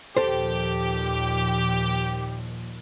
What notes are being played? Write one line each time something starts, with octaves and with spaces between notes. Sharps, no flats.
D#2 A#2 F3 G4 A4 C5